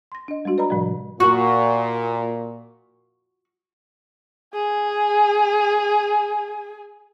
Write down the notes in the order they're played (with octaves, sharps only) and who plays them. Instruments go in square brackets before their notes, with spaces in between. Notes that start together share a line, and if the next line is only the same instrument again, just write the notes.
[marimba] C6 A#6
D4 D#5
G3 G#3 D4 F#4
B4 D5 D#5 A#5 B5
A2 C3 F3 G3
[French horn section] A#2 [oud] F#4
[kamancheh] G#4 G#5